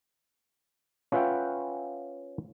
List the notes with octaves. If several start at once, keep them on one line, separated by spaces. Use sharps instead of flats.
C#4 F4 B4 E5 F#5 G5